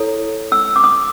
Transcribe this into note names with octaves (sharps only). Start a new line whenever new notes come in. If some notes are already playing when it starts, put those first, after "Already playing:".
Already playing: E4 A4 C#5
E6
D6
D#6